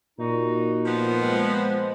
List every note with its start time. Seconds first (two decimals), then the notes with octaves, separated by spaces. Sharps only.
0.19 A#2 D#4 F#4
0.86 F3 B3
1.21 G#3 C4